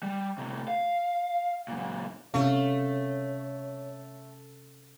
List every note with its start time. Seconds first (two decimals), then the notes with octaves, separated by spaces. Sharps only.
0.03 G3
0.38 A2 C3
0.68 F5
1.68 F#2 A#2
2.34 C3 A3 C#4 C#5 F5